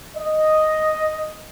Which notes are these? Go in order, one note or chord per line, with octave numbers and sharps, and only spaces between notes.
D#5